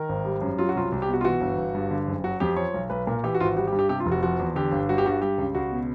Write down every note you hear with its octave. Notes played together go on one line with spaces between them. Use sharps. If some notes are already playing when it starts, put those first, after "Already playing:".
Already playing: D#3 A#4
G#1
G3
F#2
F#3 F4
F#4
C2 F4
C2
G4
B2
F#4
F4
E3 F#4
G1
G1
G2
D3
F#1
F#3 F#4
F2 G4
F3 C#5
B1
B1 B4
A#2 A#4
E3 G4
F#4
G#1 F4 F#4
G3 F#4
G4
G2
G4
C3 G4
F4
F1
F#4
F3 F#4
E2
D3 G4
G1
G3 F#4
G4
G2 F#4
G3 G4
C#2
C#2 F#4
B2